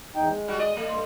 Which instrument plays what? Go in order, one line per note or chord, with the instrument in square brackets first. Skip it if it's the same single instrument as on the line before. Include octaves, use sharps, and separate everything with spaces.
[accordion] E2 D#4 G5
G#3
[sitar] G3 F#4
D5 D#5
A3
[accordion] G2 C6